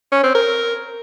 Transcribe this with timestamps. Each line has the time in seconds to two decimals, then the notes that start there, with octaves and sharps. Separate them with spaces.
0.12 C#4
0.23 C4
0.35 A#4